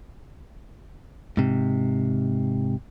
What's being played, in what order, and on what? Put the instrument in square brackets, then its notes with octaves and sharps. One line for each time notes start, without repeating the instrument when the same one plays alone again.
[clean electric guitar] G#2 C3